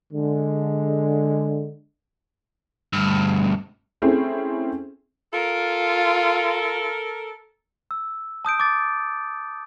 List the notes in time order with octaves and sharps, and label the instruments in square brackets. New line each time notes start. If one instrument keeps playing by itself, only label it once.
[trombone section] D3 G#3
[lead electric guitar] D2 G2
[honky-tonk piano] A3 C4 C#4 E4 G#4
[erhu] F4 [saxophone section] A4 A#4
[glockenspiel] E6
A5 D#6 G6 D7
D6 A6